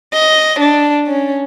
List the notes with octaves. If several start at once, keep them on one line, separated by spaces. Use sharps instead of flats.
D#5
D4
C#4